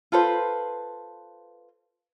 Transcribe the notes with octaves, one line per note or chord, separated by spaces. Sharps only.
F4 A4 B4 C5